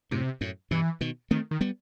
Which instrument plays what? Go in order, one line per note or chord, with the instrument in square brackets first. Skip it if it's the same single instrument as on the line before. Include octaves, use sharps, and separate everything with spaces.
[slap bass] F#2 A2 [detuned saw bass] C3
[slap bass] F#2 A2
[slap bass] G2 B2 [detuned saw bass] E3
[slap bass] B2 D#3
[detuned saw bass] D#3 [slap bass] A3 C4
[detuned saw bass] D#3
[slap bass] G3 B3